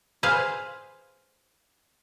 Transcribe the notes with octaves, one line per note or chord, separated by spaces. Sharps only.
G#4 B4 C5 F5